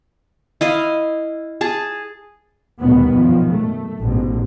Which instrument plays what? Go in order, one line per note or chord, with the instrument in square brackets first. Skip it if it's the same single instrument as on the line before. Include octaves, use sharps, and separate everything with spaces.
[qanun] E4 D#5 F5
G#4 A5
[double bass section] D2 B2 D#3 G3 B3
F#2 B2 D#3 F3
A3
A1 G#2 B2 D3